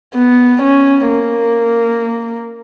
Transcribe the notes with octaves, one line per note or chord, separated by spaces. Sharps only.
B3
C#4
A#3